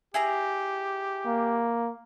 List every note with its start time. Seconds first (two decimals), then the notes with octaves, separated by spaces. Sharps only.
0.14 E4 G4 G#4 A#5
1.25 A#3